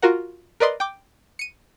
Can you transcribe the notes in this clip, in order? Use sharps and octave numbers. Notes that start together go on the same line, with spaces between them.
F4 F#4 A#4 F#5
A#4 B4 D5 D#5 C6
G5 D6
C#7 D#7